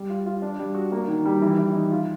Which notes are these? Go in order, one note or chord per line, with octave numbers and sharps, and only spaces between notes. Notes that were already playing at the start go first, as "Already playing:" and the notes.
Already playing: G3
F4
F4
D4
G3
F#4
A#3
D#3
G3
E3
E3
D#4
F4